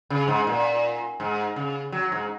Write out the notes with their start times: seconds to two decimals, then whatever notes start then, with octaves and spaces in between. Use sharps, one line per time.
0.10 C#3
0.28 G#2
0.47 A#2
1.20 G#2
1.56 C#3
1.92 F#3
2.12 G#2